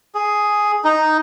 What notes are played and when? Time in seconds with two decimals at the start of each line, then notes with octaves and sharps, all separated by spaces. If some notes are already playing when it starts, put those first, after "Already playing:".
0.15 G#4
0.84 D#4